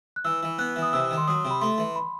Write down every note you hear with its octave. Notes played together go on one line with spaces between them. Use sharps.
F#6
E3 E6
E3
B3 F#6
E3
D#6
C3 E6
D#3
C6
F#3 D#6
C3
B5
A3 C6
E3
B5